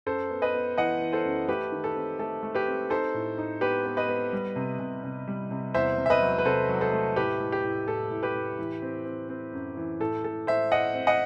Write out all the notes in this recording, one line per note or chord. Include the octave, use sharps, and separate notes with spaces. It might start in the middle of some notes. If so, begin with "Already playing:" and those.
F#2 A4 C5
B3
B4 D#5
B3
E3 D#5 F#5
E3
A4 C5
F#2
A3 G4 B4
D#3
A4
C4
A3 A4
A3
G4 B4
C4
D#4 A4 C5
A2
D#4
B3 G4 B4
B3
B4 D#5
B3
G3
C3
C3
C3
G3
C3
E2 C5 E5
C3
E5
B4 D#5
F#3
B4
C3 A4 C5
F#3
A4 C5
A3
A2 G4 B4
A2
G4
A2
A2 A4
A2
G4 B4
A2
E3
C4
C4
C4
F#2
E3
A2 A4
A2 A4
A2 C5 E5
A2 D#5 F#5
C4
D#5 F#5